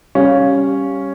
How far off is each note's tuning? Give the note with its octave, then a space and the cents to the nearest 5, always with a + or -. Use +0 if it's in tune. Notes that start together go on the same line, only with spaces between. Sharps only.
G3 +0 C#4 +0 F5 +5